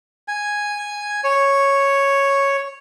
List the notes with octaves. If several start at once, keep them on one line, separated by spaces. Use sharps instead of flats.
G#5
C#5